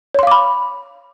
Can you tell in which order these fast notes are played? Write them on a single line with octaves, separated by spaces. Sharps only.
C#5 C6 F5 D6 B5